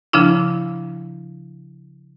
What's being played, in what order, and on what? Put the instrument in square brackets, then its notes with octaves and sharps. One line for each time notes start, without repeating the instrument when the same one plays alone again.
[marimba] C#3 F3 D4 E4